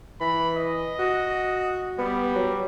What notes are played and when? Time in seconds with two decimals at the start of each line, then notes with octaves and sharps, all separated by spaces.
0.21 E3 B5
0.56 D#5
0.99 F#4
1.99 G3 B3
2.35 F#3